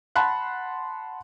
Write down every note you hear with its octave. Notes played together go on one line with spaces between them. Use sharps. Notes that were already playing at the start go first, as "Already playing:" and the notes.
F#5 A5 B5 C6 F#6